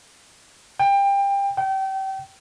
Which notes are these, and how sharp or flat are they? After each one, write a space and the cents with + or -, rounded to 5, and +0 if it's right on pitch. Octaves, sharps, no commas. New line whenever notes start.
G5 +25
G5 -30